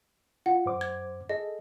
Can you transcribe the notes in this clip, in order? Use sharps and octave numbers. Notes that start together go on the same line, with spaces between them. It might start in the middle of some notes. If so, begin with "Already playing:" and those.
F4 F#5
F#2 C5 D6
G#6
G#4 A4 D#5